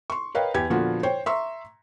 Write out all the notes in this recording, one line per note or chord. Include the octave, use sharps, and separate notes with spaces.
C6 C#6
A#4 B4 C#5 D#5 F5 G5
E2 G4 G#6
A#2 D3 F3 B3 F4 F#4
C5 C#5 G5
E5 A#5 C6 C#6 E6